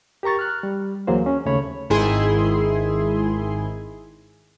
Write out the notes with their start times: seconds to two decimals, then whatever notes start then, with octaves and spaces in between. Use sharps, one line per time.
0.23 G4 A#4 A#5 C#6 A6
0.39 F6 F#6
0.63 G3
1.07 D2 E3 F#3 A#3 G#4 C5
1.26 C#4
1.45 D#2 C#3 A3 C#5 B5
1.90 G#1 G#2 D#3 E4 G#4 C6